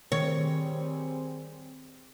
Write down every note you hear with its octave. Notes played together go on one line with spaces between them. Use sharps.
D#3 G3 C4 G#4 C#5